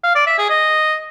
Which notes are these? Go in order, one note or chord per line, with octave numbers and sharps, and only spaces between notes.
F5
D5
E5
G#4
D#5